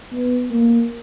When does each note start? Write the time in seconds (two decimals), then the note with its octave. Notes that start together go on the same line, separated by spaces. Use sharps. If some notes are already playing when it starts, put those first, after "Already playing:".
0.12 B3
0.51 A#3